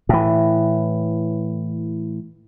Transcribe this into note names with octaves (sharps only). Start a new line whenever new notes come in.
A2 E3